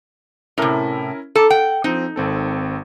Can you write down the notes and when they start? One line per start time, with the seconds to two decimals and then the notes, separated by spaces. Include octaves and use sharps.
0.58 A2 C3 C#4 E4 A#4
1.35 A4 A5 A#5 D6
1.50 F#5 G5
1.84 F3 C4 D#4
2.16 G#1 C4 A4